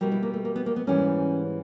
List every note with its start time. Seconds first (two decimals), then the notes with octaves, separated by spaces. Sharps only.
0.01 B2 G3 A#3
0.12 E4
0.23 A#3
0.34 A3
0.45 A#3
0.56 B3
0.66 A#3
0.76 B3
0.87 G#2 E3 G3 C#4